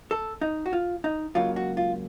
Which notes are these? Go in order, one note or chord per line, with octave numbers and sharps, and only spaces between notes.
A4
D#4
F#4
F4
D#4
C#2 C#3 F#3 A#3 F4
F#4
F4